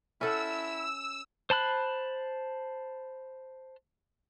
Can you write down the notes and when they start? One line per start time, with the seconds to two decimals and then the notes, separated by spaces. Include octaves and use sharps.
0.21 C#4 E4 A4 F#5 E6
1.50 C5 A5 B5 F#6